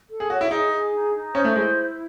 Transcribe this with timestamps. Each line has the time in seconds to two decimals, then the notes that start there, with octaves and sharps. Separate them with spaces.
0.10 A4
0.20 G#4
0.30 F#4 C#5
0.41 E4
0.51 D#4 G#4
0.72 G#4
0.93 D#4
1.14 D#4
1.34 C#4 C5
1.44 A3
1.55 G#3 E4